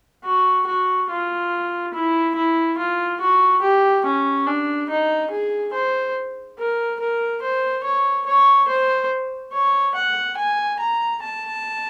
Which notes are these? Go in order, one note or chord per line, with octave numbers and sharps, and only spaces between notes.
F#4
F#4
F4
E4
E4
F4
F#4
G4
C#4
D4
D#4
G#4
C5
A#4
A#4
C5
C#5
C#5
C5
C#5
F#5
G#5
A#5
A5